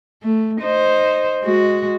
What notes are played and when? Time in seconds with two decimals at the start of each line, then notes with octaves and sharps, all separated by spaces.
0.22 A3
0.61 D#4 C5
1.43 G#3 F#4